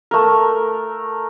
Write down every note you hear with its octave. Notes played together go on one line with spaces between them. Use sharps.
A3 A#4